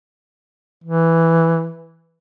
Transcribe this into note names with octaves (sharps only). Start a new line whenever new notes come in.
E3